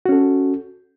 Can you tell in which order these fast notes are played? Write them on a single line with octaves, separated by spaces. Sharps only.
F#4 C#4 A4